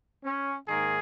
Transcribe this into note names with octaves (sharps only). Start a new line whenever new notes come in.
C#4
G#2 D#3 A#3 G#4